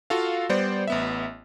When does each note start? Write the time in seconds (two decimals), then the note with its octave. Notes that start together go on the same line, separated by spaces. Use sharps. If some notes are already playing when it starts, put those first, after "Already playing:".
0.10 F4 F#4 A4 F5
0.49 G3 B3 C5 D5
0.88 A1 B3 E5